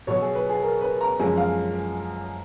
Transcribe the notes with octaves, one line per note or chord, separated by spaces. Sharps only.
B2 F#3 C#5
G#4
B4
G#4
A#4
B4
A#5
F#2 F3 G#3 G#5
F5